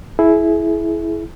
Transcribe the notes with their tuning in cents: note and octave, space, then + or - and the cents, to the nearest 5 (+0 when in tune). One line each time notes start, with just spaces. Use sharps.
E4 +0 G#4 +30